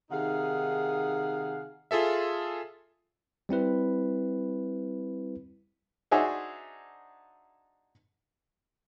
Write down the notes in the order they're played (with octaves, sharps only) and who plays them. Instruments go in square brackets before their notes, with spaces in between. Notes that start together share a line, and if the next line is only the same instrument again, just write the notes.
[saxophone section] C3 D#3 D#4 G#4 F5 F#5
[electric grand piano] F4 G#4 A4 E5
[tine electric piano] G3 C4 E4 B4
[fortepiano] D4 D#4 F#4 G#4 C5 E5